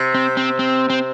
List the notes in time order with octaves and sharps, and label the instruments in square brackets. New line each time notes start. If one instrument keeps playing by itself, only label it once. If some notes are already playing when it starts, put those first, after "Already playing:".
Already playing: [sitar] C3
[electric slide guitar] C4
C4
C4
C4